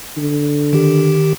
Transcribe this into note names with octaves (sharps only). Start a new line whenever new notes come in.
D3
D#3 G4